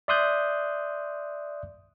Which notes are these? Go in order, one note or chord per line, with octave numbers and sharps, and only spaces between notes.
D5 E5 C6 D#6 F#6 G6